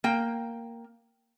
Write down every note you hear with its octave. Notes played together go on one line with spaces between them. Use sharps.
A#3 G5